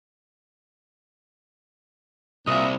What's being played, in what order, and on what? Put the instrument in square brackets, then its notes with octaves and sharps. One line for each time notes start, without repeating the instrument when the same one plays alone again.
[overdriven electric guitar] C2 [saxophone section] A#2 D#5 E5